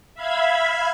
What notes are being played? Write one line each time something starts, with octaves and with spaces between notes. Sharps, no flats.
E5 F5 B5 G#6